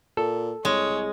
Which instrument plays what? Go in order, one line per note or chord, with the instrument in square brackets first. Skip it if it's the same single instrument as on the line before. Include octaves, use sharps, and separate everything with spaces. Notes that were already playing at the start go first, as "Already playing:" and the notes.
[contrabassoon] A#2 [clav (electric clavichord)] A4
[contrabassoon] C2 [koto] G#3 [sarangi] C#5